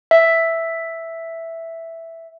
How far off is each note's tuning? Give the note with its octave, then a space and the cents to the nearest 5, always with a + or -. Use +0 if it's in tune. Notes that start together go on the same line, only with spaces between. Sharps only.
E5 +0